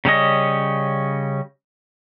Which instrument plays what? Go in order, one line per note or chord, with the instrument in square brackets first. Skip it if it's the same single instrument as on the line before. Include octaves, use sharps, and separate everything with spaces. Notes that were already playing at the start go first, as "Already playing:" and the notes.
[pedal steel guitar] C#3 G3 C#4 D#5